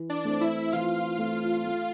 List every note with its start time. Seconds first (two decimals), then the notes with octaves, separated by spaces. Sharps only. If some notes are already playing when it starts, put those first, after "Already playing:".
Already playing: E3
0.10 D4 D5
0.25 A3 C4
0.41 E4 E5
0.72 E3 F4 F5
1.19 A3 C4
1.66 A3